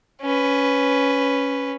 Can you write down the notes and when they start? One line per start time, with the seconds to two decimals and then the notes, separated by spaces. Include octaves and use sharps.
0.22 C#4 B4